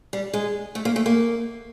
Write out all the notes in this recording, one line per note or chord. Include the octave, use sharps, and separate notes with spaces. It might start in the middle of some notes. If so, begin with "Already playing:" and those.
G3
G#3
A3
A#3
A3
A#3